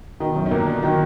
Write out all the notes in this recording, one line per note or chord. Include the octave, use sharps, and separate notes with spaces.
B2 D#3
F#2
D#3
A#2 D3 A#3
D4
D#3 F#3 A#3